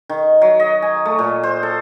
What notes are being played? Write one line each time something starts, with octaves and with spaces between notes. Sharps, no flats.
D#3
F#3
D#5
G#5
A3
A#2
C5
A4